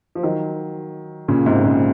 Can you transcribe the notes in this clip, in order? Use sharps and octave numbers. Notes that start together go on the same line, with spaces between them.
F3
D#3 F#3
A#2 C#3
G#2 C3
A#2 C#3